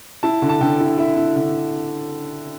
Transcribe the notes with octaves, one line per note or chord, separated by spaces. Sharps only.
E4 A5
D3
A5
D3 G5
E4
E4 E5
E4
D3